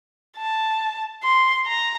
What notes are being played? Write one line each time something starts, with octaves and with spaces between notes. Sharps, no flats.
A5
C6
A#5